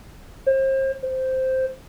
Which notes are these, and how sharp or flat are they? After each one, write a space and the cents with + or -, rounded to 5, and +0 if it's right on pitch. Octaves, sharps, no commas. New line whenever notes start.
C5 +35
C5 -5